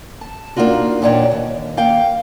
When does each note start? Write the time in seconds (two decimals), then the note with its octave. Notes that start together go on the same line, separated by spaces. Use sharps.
0.21 A5
0.56 A#3 D4 D#4 F4 F#4
1.02 E2 A#2 D4 D#4 C#5 G5
1.32 D#2
1.77 A#3 F5 G5